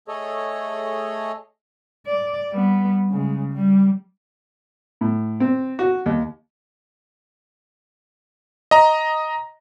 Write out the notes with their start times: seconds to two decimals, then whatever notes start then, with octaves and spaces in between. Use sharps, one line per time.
0.08 A3 G#4 A4 C#5 D#5
2.07 D5
2.52 G3 B3
3.10 C#3 G#3
3.54 G3
5.01 A2
5.40 C4
5.79 F#4
6.06 D#2
8.71 D#5 A#5